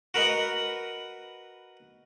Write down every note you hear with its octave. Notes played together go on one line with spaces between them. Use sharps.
F#4 A#4 B4 D#5